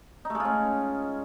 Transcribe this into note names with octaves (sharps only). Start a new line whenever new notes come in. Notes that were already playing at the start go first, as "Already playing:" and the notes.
D#4
A3
G#3
F4
C#4